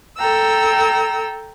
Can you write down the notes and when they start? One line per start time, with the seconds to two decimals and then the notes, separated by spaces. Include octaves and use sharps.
0.18 A4 G5 A#5 E6